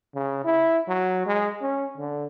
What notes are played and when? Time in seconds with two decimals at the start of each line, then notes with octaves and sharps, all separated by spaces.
0.15 C#3
0.45 E4
0.88 F#3
1.27 G#3
1.62 C#4
1.98 D3